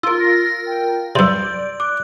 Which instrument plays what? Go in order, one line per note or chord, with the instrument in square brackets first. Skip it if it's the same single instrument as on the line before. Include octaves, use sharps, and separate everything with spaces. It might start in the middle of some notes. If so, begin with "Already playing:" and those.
[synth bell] F4 A#4 [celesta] E6
[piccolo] A#6
G5
[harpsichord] G2 C3 [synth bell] D5 [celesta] C6 E6 [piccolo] G6
[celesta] D6 [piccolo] F#6